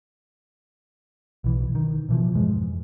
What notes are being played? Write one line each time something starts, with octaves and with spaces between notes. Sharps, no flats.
B1 E3
D#3
B2 E3 F3
F2 G#2 G#3